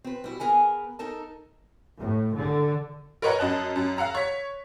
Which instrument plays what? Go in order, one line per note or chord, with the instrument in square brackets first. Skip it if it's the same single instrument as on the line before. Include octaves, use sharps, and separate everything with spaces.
[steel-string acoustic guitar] C4 B4
G3 E4 F#4
B3 G#4 A#4 B4 G#5
D#4 A4 A#4 A5
[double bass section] A2
D3
[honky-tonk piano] A#4 B4 C#5 D#5 F#5 A#5
F#2 D#5 A5 F#6
F#2
F5 F#5 A#5 E6
C#5 B6